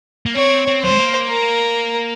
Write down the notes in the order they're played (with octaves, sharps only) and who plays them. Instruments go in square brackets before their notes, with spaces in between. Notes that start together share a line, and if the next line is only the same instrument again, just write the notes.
[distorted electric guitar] A#3
[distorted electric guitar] C4 [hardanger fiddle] C#5
[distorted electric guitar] C4
[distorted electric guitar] F#3 [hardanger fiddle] C5
[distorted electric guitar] G#3
A#3
[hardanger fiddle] A#4